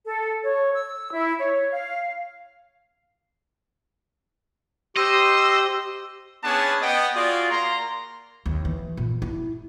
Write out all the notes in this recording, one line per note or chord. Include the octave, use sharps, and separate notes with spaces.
A4
C#5
E6
E4
C#5
F5
G4 C5 D#5 C6 E6
B3 C#4 D4 G#4 B4 A5
B3 D#5 G5
F4 F#4 G#4 D5
A#3 A#5 C6
D#2
E3
A#2
E4